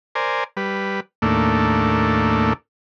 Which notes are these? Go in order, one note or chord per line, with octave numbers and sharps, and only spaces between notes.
A#4 C5 D5 G#5
G3 B4
D#2 A2 A3 A#3 D4